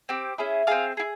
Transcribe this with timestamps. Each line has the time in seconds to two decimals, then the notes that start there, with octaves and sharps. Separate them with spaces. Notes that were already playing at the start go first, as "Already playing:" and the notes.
0.09 C4 G4
0.38 C#4 E4 G#4
0.67 C4 E4 G#4 F5
0.97 E4 G#4